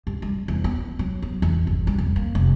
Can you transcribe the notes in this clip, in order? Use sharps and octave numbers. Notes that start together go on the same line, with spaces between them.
G2
G3
E2
B3
F#3
B3
E2
G1
G3
F2
A#3
F1